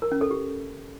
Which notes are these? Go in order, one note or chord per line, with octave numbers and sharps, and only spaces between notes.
A#4
C#4
A4
G4